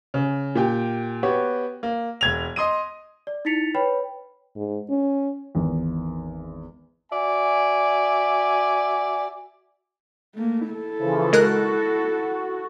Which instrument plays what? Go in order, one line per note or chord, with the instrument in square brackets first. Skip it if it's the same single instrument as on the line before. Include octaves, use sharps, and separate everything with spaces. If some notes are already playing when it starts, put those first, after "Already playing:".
[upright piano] C#3
A#2 G4 G5
B3 F#4 G4 C#5
A#3
E1 G#6 F7
D#5 C6 D#6 D#7
[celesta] D5
D#4 E4 A6 B6 C#7 F7
B4 C#5 G5 B5
[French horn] G#2
C#4
[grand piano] G#1 E2
[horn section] F#4 D5 E5 G#5
[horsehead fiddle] A3 A#3
E4 A4
[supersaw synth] C#3 E3 F3
[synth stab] G#3 A#4 F#6 [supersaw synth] F#4